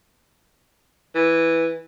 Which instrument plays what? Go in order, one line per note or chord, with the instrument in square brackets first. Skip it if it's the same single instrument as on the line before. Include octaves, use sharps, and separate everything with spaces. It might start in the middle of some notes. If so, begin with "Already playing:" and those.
[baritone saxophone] E3